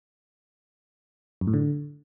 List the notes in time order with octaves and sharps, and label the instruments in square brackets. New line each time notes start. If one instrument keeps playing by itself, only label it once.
[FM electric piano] F#2
A2
D3